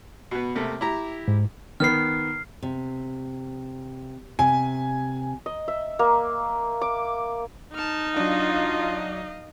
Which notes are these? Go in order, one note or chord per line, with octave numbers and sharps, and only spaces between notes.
B2 B3
C3 A3 A#3
E4 G4 A#5
G#2
D#3 B3 F6 C7
C3
C3 G#5
D#5
E5
A#3
D6
D#4 A5 F6
F#3 D4 F4 D#5 F5